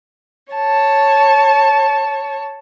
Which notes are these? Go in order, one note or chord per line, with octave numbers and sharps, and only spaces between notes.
C#5 A5